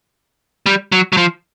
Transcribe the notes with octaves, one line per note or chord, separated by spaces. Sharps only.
G3
F#3
F#3
F3